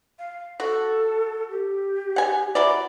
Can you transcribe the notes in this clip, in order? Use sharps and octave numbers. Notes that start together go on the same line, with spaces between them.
F5
F#4 A4
G4
F#5 G#5
F#3 E4 D5